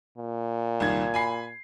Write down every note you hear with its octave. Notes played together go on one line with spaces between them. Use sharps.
A#2
C2 D#3 G#6
G#5 B5 C7